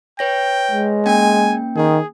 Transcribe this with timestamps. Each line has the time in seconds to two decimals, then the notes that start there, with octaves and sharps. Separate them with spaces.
0.19 B4 C#5 G5 A#6
0.71 G#3
1.06 A#3 C#4 G5 G#5
1.76 D#3 G#4